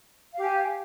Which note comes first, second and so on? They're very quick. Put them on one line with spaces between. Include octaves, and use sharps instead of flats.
F5 G4 G#5